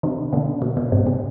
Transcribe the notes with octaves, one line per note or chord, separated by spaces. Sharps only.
C3 D#3
B2 D3
B2
B2
G#2 C3
C3